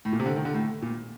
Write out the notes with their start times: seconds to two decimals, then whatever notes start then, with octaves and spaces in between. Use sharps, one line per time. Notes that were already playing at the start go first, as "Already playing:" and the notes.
0.05 A2
0.13 A#2
0.20 C3
0.26 D3
0.36 D#3
0.45 D3
0.54 A2
0.82 A#2